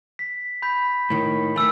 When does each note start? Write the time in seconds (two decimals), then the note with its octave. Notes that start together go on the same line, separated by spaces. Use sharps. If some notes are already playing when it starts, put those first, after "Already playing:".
0.19 B6
0.62 B5 G6 B6
1.10 A2 D#3
1.56 D#3 A3 G#5 E6